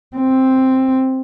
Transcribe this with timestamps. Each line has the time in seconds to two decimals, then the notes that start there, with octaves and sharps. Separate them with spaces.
0.17 C4